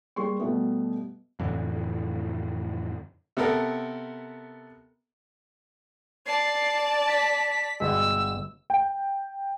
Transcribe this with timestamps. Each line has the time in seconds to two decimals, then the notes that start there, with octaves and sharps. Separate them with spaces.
0.16 G3 A#3 G#4 C6 C#6
0.39 B2 G3 A3 B3
1.39 F2 A2 D3 E3
3.37 C3 B3 A4 A#4
6.27 D5 A5 C7
7.08 B6
7.80 G1 B2 G#3 E6
8.70 G5